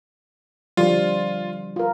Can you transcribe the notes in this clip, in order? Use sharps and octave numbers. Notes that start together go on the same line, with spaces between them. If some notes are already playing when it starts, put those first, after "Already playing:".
D3 F3 G3 F4
F4 A#4